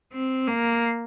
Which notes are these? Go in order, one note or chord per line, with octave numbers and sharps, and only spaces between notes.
C4
A#3